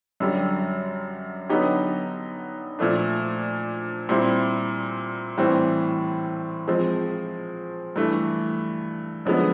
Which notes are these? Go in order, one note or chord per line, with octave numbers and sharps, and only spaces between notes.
F#2 D3 G3
D3 F#3 B3 D#4 G4
A#2 F3 A3 D4
A#2 G3 C4 E4
A2 E3 G3 C4
F3 G#3 C4
G2 E3 A3
F#2 D3 F3 G#3 B3